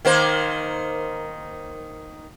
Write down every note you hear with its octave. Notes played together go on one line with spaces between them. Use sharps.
D#3 A#3 C5